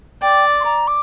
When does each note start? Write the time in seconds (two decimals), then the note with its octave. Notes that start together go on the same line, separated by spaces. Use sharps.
0.22 D5 G5
0.60 C6
0.65 A#5
0.88 D6